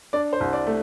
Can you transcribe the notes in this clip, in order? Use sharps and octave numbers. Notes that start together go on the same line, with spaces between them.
D4 D5
C5
C2
D5
A3